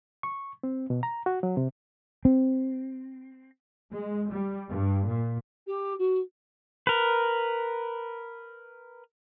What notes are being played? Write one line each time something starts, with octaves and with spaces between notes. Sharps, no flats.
C#6
C4
B2
A#5
F#4
F#3
C3
C4
G#3
G3
G2
A#2
G4
F#4
A#4 B4